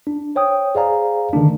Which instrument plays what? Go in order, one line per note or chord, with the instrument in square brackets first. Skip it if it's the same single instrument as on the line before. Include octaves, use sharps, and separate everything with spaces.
[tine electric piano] D4
C5 C#5 G5 D#6
G#4 C5 D5 F5 G#5 A#5
D3 D#3 A3 D4